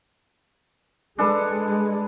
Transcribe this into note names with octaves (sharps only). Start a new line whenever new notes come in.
G#3 D4 A4 B4